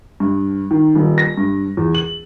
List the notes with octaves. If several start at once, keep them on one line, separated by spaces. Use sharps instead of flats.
G2
D#3
D#1
A#6
G2
E2
F#7